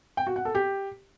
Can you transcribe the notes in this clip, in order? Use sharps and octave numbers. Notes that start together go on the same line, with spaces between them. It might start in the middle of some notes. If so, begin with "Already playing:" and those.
G5
F#4
F#5
A4
G4